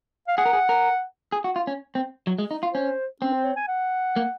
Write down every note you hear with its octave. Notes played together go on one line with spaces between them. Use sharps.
F5
G#4 F#5
A#4
G#4
A#4
G#4
F#4
F4
C#4
C4
F#3
G#3
D#4
F4
C#4 C5
C4 C#4
C5
C#5
G#5
F#5
A#3